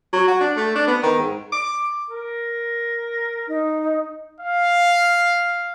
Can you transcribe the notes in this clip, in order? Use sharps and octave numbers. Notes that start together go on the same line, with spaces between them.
F#3
F#4
D4
A3
D4
B3
D#3
G#2
D6
A#4
D#4
F5